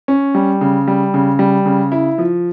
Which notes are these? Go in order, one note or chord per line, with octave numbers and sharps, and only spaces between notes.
C#4
G3
C#3
G3
C#3
G3
C#3
E4
F3